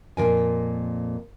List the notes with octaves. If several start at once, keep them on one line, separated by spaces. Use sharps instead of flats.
F2 A#2 F3 A#4 G#5